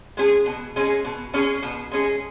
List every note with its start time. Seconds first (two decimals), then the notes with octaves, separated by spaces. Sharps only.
0.17 G#3 C#4 G#4
0.46 B2
0.76 G#3 C#4 G#4
1.05 B2
1.33 G#3 C#4 G#4
1.62 B2
1.91 G#3 C#4 G#4